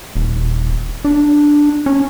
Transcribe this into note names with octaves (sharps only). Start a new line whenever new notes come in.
D#1
D4
C#4